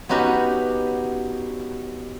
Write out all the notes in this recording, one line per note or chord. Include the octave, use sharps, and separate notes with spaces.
B3 C#4 D#4 F#4 G4 B4